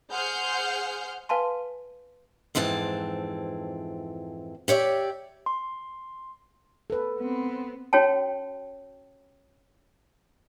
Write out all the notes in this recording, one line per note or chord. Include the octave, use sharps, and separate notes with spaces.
G#4 C5 F#5 C6 F6 G6
B4 F5 G#5 A5 C6
F2 G#2 E3 C4 A5
G4 C#5 D5 E5
C6
A4 B4
B3 C4
C#4 F#4 C#5 G5 A5